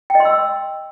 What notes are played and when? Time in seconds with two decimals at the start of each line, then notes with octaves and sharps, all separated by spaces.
0.10 G5
0.15 D#5
0.20 C6
0.25 E6